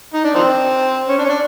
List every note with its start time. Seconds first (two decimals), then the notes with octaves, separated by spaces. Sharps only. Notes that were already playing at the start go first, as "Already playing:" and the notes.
0.13 D#4
0.24 D4
0.34 D#3 F3 C4
1.08 C#4
1.18 D4
1.25 C#4
1.29 D4